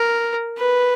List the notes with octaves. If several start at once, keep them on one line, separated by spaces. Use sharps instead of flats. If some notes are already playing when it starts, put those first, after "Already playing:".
Already playing: A#4
B4